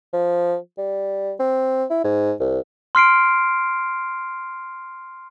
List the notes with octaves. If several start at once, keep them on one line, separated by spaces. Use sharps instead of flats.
F3
G3
C4
E4
G#2
C2
C6 F6 C7 D7